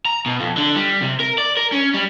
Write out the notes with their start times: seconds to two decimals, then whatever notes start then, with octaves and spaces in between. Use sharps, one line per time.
0.06 A#5
0.26 B2
0.40 F2
0.57 D3
0.75 G3
1.02 C3
1.20 A#4
1.38 D5
1.57 A#4
1.72 C#4
1.94 G3